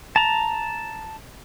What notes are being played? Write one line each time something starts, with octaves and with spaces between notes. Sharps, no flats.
A5 A#5